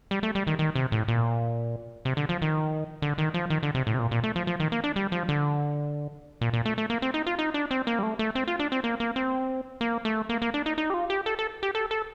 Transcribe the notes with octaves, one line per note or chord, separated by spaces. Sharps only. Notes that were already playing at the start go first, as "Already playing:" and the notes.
G3
A3
G3
D#3
D#3
C3
A2
A#2
C3
D3
F3
D#3
D3
D#3
F3
D#3
D3
C3
A2
C3
A#2
A#2
A3
F3
F3
D#3
A#3
D4
G3
F3
D3
A#2
A#2
A3
A3
A#3
C4
D#4
F4
D#4
D4
C4
A#3
G3
A3
A3
C4
F4
D4
C4
A#3
A#3
C4
A#3
A3
A#3
A#3
D4
D#4
D#4
G4
F4
G4
A4
A4
G4
A4
A4